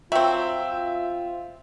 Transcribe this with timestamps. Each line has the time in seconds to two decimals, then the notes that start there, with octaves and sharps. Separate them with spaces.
0.12 F#3 C4 F4 E5 G5